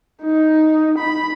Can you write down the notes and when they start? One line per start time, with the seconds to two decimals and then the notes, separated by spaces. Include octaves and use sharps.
0.23 D#4
0.98 B5